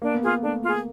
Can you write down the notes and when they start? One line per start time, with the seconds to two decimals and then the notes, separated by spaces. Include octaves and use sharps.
0.02 A#3 D4
0.14 B3
0.22 A#3 F4 G#4
0.42 A3 D4
0.64 F4 G#4